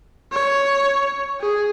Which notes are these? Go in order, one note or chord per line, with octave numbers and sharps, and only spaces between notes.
C#5
G#4